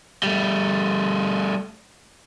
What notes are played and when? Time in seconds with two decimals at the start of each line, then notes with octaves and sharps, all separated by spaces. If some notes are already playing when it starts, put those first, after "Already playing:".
0.23 G3 A3